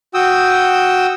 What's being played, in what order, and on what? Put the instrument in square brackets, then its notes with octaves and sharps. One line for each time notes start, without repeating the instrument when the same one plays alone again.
[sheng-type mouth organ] F#4 G5 D#6 E6